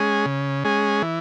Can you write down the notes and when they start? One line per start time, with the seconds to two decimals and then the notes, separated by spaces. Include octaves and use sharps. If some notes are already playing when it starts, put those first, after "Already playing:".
Already playing: G#3 C#4 G#4
0.26 C#3
0.64 G#3 C#4 G#4
1.02 E3